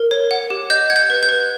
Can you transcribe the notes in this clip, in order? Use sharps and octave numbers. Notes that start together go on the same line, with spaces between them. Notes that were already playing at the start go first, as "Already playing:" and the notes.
Already playing: A#4
C#5
F#5
G4
D#5 G6
F#5 G#6
G6
B4
G6
B4